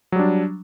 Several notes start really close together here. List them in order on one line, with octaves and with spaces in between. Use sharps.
F#3 G3 D4